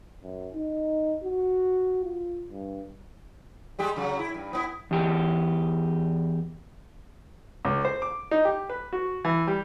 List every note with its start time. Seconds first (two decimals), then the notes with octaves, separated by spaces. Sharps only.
0.23 F#2
0.54 D#4
1.24 F#4
2.04 F4
2.50 G2
3.79 G3 G#3 G4
3.96 C#3 F#3
4.19 E4
4.34 G2
4.53 B3 C4 E4
4.91 E2 G4
7.65 C#2
7.85 C5
8.02 D6
8.31 D#4
8.45 G4
8.70 B4
8.93 F#4
9.25 E3
9.47 G3